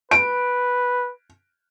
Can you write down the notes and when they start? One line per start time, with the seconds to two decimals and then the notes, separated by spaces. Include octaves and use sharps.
0.11 B4 D7